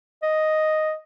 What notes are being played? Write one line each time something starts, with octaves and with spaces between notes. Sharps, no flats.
D#5